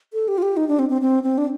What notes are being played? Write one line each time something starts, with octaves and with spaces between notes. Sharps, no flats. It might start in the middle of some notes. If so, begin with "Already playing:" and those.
A4
G4
F4
G4
D#4
D4
C4
C4
C4
C4
D4